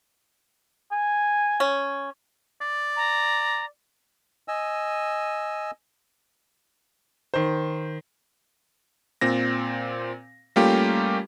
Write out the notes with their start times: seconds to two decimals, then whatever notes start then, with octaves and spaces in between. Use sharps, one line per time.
0.92 G#5
1.60 C#4
2.62 D5
2.96 A#5
4.48 D#5 G#5 E6
7.34 D#3 C5
9.21 A#2 C4 A#6
10.56 G3 A3 A#3 C#4 F4 G4